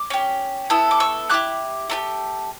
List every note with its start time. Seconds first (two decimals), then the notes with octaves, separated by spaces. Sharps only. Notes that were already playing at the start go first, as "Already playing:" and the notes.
Already playing: D6
0.10 C#4 G4
0.70 B3 E4 A4 E6
0.91 D6
1.00 C#6 E6
1.30 A3 E4 G4 D6 F#6
1.90 A3 D4 G4